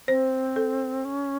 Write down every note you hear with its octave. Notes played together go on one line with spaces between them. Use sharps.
C4 C5
A4
C#4